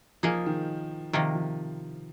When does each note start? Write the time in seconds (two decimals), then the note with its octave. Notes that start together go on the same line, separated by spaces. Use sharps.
0.23 F3 A#3 D#4 G#4
0.46 D#3
1.13 C3 D#3 F3 A#3
1.35 F3